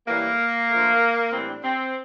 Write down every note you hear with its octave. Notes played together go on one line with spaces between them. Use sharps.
A2 E3 G3 A#3
D3 F3 A3
A2 E3 G3 C4
D4
C4